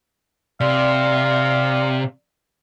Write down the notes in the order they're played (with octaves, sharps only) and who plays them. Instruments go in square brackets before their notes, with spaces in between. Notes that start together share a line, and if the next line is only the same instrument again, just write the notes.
[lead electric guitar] C3 [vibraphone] D5 C6 [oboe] F5